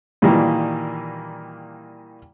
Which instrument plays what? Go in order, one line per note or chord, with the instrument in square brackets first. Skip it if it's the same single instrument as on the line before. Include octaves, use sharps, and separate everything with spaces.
[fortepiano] A#2 D#3 E3 G3 A#3